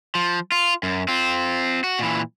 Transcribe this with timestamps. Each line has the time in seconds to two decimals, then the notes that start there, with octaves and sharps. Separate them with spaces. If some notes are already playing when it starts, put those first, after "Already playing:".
0.15 F3
0.52 F4
0.83 F#2
1.08 C4 F4
1.84 F#4
1.99 A#2 E3